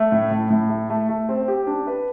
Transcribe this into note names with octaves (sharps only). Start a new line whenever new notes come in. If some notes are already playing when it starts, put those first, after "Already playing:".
Already playing: A3
A2
A2
A2
A3
A3
A3
C4
G4
D4
B4